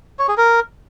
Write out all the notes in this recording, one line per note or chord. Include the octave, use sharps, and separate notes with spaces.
C#5
G#4
A#4